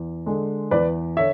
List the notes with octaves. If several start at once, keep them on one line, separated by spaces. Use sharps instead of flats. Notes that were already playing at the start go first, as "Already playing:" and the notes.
Already playing: E2
D3 G#3
E2 B4 D5
D3 C#5 E5